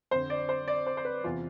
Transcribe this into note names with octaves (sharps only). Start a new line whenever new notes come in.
F2 D3 C5
D5
C5
D5
C5
C5
B4
E2 C3 E3 F4